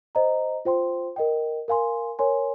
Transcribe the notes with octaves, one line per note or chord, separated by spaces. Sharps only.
C5 D#5 A#5
F4 C5 G5 C6
A#4 D#5 G5
A#4 F5 G#5 C6
A#4 C#5 G#5 C6